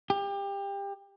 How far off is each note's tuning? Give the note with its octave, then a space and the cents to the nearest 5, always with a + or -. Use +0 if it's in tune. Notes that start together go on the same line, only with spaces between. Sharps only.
G4 +25